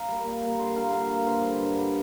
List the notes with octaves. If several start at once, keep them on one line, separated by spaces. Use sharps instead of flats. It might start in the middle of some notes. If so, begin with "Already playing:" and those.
Already playing: F5 A#5
G3 A#3
A#2
G3 A#3
D3 G5 C6
A#3 F5 A#5
D3 F5 A#5
A#3
G2 C5 F5
D3 G3
G2
D3 G3